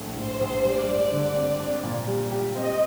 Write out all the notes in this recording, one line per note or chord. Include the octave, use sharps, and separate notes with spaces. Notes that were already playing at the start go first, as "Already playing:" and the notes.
Already playing: A#1 A2 A3
A2 C5
A#1
G3 D5
G2
D3 D5
C4
D4
A#2
G3
G4
C4 D#5